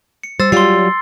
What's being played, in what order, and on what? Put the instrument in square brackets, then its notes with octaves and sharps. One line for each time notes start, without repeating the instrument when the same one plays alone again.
[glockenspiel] C#7
[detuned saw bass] G3 [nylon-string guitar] C5 [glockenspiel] E6 A6
[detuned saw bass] F#3 [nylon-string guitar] G3 F4 [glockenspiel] C6 C7